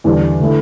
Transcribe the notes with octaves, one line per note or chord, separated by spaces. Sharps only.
E2 D3 G3 D4
D3 A3 E4